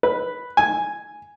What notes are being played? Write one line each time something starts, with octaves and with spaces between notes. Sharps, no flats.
B4
G#5